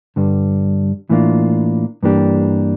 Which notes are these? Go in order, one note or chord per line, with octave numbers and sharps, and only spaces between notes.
G2 D3 G3
A2 E3 A#3 D4 F4
G2 E3 A#3 D4 G4